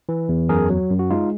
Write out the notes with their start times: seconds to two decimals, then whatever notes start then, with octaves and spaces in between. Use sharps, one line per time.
0.09 E3
0.29 E2
0.49 F#2 G#4 A#4
0.70 F#3
0.90 F#2
0.99 F#4
1.10 G#3 D#4 F4